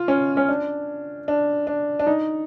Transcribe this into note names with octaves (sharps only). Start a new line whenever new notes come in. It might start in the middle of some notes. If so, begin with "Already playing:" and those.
Already playing: F4
C#4
C#4
D4
D4
D4
D4
D#4